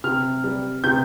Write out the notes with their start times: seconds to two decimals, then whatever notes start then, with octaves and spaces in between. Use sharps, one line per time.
0.04 C3 F6
0.44 G3
0.84 C3 G6